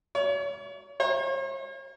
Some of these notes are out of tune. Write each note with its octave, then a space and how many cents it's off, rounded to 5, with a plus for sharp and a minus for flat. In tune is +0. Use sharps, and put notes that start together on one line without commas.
C#5 +40
C#5 -45